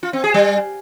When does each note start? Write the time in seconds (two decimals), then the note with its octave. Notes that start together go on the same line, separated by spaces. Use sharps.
0.03 F4
0.13 C4
0.24 G#4
0.34 G3